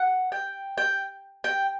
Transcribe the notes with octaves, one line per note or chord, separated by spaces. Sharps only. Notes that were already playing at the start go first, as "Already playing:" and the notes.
Already playing: F#5
G5
G5
G5